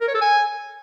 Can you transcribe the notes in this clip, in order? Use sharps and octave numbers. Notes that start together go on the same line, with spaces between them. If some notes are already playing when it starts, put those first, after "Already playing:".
A#4
C#5
A4
G#5